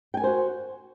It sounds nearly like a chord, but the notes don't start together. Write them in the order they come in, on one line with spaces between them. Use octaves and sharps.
G5 G#5 A#4 C5 F#4